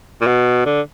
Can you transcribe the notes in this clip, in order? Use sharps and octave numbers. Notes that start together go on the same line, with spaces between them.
A#2
B2
D3